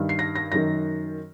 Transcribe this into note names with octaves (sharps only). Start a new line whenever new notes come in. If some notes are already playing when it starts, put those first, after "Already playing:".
Already playing: G2 D#3
C7
A#6
A#6
F#2 D#3 A#6